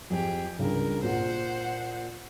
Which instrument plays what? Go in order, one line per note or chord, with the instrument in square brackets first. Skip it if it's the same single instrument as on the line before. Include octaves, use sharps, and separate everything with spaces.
[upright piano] F2 [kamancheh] G4 G#4
[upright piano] C#2 G2 [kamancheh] A#4
[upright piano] A#2 [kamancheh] C5 F#5